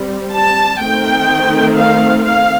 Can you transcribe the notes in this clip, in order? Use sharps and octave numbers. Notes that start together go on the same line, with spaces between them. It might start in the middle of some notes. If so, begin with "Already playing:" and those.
Already playing: G3 C4
A5
D#3 A3 C4 G5
F5
F5